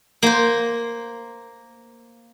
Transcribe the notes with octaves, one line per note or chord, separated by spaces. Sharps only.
A#3 C5